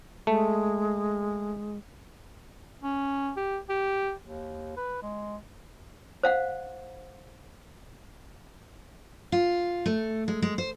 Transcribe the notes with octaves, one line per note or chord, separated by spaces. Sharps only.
G#3 A3
C#4
G4
G4
D#2
B4
G#3
C5 F5 F#5
F4
A3
G#3
G#3
C5